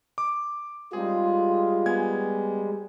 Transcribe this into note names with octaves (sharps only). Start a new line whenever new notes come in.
D6
G3 G#3 C4 D#4 F4 G#4
B3 G#5 G#6